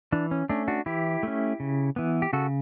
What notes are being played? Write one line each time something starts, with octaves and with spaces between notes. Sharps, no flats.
E3 D4
C#4
A3 C#4 D4
D4 F#4
E3 E4 G4
A3 C#4
C#3
E3 B3
G4
C#3 F#4 A4